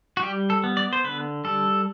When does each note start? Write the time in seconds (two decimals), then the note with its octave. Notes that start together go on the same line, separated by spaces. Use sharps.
0.17 F#4
0.23 G3 G4
0.50 A4
0.64 B3
0.77 D5
0.93 C5
1.04 D3 B4
1.45 G3 A4